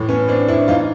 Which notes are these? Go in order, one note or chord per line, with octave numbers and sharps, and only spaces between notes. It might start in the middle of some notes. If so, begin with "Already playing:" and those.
Already playing: A2 E3
B3 C#4
C4 D4
D4 E4
E3 D#4 F4